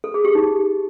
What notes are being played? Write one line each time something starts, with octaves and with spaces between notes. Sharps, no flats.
A4
G#4
G4
D#4